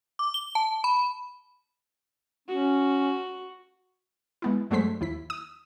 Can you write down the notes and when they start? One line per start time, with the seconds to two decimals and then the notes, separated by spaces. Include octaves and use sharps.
0.19 D6
0.34 G7
0.55 A5
0.84 B5
2.48 C#4 F#4
4.42 G#3 B3 E4
4.70 G2 F#3 G#3 A3 C5 B6
5.01 D#2 E4 B6
5.30 D#6